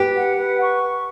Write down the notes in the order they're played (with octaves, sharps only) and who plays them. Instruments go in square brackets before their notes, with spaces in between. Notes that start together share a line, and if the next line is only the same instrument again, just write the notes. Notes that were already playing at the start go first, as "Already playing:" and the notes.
Already playing: [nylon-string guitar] G4 [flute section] B4
[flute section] F#5
B4
C#6